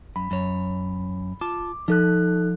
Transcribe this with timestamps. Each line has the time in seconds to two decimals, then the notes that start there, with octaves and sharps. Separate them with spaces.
0.16 F#2 B5
0.31 F#2 C#5
1.41 F4 A5 D6
1.88 F3 D#4 A4 F#6